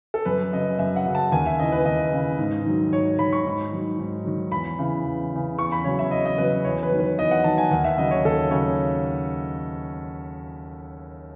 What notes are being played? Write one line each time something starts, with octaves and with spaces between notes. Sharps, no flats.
A4
F#2 B4
C#3 F#3 D#5
F#2 E5
F#5
C#3 F#3
A5
D#2 G#5
E5
C#3 E3 D#5
B4
D#2 D#5
C#3 E3
G#2
D#3 F#3
G#2 C#5
D#3 F#3 B5
C#6
G#2
D#3 F#3
G#2
D#3 F#3
E2 B5
C#3 E3
E2
C#3 E3
E2 C#6
B5
C#3 F#3 C#5
E5
E2 D#5
D#5
C#3 F#3 B4
E2 C#5
B4
D#3 F#3
B4
E2 D#5
F#5
D#3 F#3 A5
G#5
D#2 F#5
E5
C#3 F#3 D#5
C#5
D#2 A4
C#3 F#3 C#5